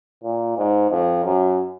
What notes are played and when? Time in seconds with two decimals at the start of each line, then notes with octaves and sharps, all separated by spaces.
0.24 A#2
0.58 G#2
0.91 F2
1.24 F#2